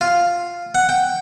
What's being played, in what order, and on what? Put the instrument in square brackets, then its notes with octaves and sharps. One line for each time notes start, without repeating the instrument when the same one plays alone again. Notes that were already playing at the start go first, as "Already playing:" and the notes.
[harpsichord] F4
F#5
G5